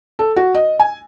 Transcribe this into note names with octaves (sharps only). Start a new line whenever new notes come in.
A4
F#4
D#5
G#5